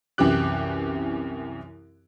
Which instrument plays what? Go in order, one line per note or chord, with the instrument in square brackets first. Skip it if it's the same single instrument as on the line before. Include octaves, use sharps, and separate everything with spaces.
[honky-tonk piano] C2 F#2 E3 G4 D6 F#6